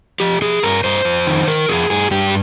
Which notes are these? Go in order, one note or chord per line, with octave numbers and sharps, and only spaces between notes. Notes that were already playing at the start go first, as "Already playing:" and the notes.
F3 G4
F3 G#4
G2 A#4
G2 C5
F2
D#3
D#3 A#4
F2 G#4
G2 G#4
G2 G4